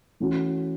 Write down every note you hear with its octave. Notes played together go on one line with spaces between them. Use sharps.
E3 A3 C#4 F#4